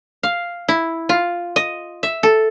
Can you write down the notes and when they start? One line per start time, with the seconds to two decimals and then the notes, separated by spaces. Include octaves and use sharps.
0.23 F5
0.68 E4
1.09 F4
1.56 D#5
2.03 E5
2.23 A4